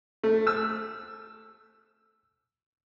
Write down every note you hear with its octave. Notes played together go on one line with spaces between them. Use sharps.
A3
E6